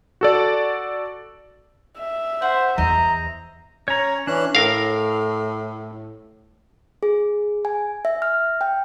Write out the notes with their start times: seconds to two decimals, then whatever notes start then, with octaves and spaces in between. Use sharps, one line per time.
0.21 F#4 A4 D5
2.00 E5
2.42 C5 F#5
2.78 E2 C5 D#5 A#5
3.88 C#4 C#5 A#5
4.27 E3 C#4 D4 F#6
4.55 A2 A#4 F5
7.03 G#4
7.65 G#5
8.05 E5
8.22 F6
8.61 G5